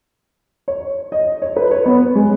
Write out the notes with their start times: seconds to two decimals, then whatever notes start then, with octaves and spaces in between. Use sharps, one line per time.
0.68 C#5
1.12 D#5
1.42 C#5
1.57 B4
1.71 C#5
1.86 B3
2.15 G#3